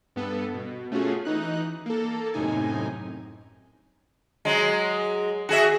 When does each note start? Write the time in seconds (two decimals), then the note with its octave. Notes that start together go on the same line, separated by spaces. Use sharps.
0.16 G2 B3 A4
0.54 B2
0.92 A3 C#4 F4 F#4 G#4
1.25 E3 D#4 F#6
1.86 A#3 A4
2.34 F#2 A2 C3 D#4 G#5
4.45 F#3 G#3
5.49 F#4 G#4 E5